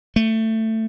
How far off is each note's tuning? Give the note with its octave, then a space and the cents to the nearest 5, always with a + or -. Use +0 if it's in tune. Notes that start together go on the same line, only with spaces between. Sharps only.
A3 +15